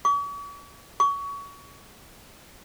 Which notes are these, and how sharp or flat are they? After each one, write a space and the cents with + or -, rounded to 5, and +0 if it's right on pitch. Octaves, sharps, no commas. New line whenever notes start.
C#6 +45
C#6 +25